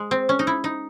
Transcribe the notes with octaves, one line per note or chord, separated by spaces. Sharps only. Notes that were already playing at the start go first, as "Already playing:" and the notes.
Already playing: G#3
C4
C#4
D#4
E4
D#4